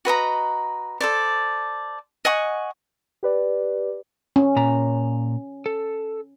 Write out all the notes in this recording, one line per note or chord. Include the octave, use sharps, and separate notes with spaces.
F#4 B4 D#5 A#5
A4 C5 D5
D#5 F#5 G#5 C#6
G4 B4 D5
C#4
A#2 A#5
A4